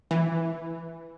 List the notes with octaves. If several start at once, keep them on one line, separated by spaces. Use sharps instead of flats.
E3